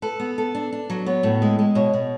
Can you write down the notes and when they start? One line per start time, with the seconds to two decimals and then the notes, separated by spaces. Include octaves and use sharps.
0.02 A4 B4
0.20 B3
0.38 A4
0.55 D4
0.72 D4
0.90 F#3
1.06 B3 C#5
1.23 A2
1.42 G#3
1.59 G#3
1.75 B2 C#5
1.94 B2